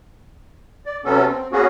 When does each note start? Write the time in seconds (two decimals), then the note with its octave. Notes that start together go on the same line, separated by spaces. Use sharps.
0.86 D5
1.05 C3 F#3 B3 C#4 A4
1.28 C4
1.52 A#3 B3 C#4 F#4 G#4